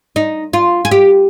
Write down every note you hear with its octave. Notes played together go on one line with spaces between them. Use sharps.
D#4
F4
G#4
G4